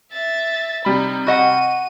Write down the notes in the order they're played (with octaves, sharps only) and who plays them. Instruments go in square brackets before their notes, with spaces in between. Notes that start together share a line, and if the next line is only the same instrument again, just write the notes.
[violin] E5 A6
[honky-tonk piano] C3 G3 B5 [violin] D#4
[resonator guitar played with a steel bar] F#4 D#5 F#5 [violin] D#7